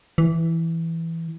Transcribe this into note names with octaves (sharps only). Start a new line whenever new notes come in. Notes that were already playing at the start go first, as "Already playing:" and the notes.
E3